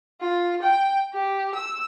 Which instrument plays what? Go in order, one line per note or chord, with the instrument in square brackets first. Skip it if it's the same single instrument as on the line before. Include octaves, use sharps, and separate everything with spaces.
[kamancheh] F4
G5
G4
E6